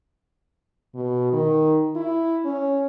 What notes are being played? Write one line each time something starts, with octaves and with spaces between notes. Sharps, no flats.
B2
D#3
E4
C#4